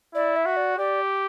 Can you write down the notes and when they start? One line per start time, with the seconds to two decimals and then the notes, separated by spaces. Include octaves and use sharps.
0.15 E4 D5
0.36 E5
0.46 F#4
0.57 D5
0.78 G4 D5